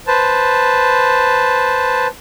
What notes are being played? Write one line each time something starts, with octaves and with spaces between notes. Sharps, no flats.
B4 C5 A5